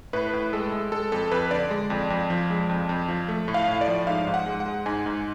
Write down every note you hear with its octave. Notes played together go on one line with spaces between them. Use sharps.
A2 B4
A2
G#3 A4
G#3
G#3 A4
F2 A4
F2 B4
D3 D5
G#3
F2
F2
F3
G#3
F2
F2
F3
A3
A2
F5
A2
D5
F3
G#2 F5
G#2
F#5
G#3
F#5
G#3
G#2 G#5
G#2